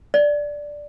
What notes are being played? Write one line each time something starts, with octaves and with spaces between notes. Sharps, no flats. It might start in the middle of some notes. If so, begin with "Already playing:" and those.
D5